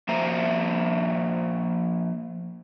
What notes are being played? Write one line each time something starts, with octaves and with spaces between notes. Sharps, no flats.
F3 A#3 C5 E5 A#5